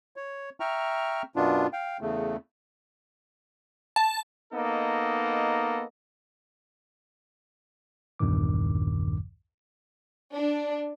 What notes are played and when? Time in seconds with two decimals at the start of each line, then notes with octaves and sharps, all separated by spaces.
0.16 C#5
0.60 E5 G5 A#5 C#6 F6
1.36 F#2 B2 B3 D4 F4
1.73 F5 G5
2.01 E2 C#3 A3
3.96 A5
4.53 A#3 B3 D#4 A4 D#5
8.19 A#1 E2 G2 A#2 D#3 D6
10.33 D4